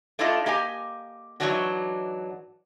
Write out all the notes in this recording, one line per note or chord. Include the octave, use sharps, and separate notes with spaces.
A3 D4 E4 F4 A4 D#5
A#3 G4 D#5 G#5
G#2 C3 E3 F#3 D4 F#4